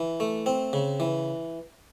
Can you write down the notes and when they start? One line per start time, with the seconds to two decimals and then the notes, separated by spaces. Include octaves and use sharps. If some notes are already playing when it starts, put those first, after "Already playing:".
Already playing: E3
0.20 A3
0.46 C4
0.73 C#3
1.00 E3